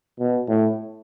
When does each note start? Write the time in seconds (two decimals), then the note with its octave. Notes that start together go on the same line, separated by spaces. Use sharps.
0.19 B2
0.48 A2